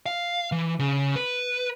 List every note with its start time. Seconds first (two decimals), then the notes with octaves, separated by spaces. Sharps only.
0.06 F5
0.52 E3
0.79 C#3
1.16 B4